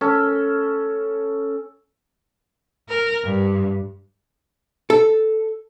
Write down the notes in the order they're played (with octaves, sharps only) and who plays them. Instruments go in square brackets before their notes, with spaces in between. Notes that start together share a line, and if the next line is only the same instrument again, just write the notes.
[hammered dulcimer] C#4 A4
[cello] A#4
G2
[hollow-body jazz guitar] A4